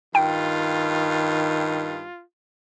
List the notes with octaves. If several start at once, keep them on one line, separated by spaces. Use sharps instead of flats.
G2 D#3 F4 G5